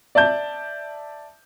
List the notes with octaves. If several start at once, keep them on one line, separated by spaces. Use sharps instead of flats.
D5 E5 A5 G6